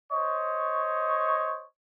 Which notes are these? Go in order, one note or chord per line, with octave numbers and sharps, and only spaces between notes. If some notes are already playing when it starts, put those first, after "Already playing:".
C5 C#5 D#5 C#6